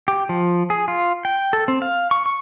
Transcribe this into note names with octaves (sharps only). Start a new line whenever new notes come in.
G4
F3
G#4
F4
G5
A4
C4
F5
C#6
C#6